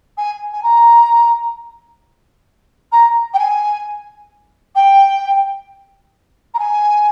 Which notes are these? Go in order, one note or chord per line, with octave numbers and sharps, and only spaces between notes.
G#5
G#5
A#5
A#5
G5
G#5
G5
A#5
G#5